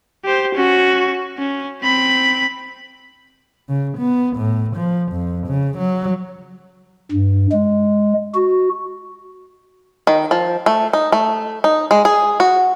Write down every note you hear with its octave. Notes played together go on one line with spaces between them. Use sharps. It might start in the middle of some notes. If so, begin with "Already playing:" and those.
G4 C5
C#4 F#4
C#4
C4 B5
C#3
B3
A2
F3
F2
C#3
F#3
G2
G#3
F#4
D#3
F3
A3
D#4
A3
D#4
G#3
G#4
F#4